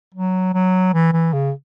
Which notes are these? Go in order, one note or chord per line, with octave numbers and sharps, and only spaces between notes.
F#3
F#3
E3
E3
C#3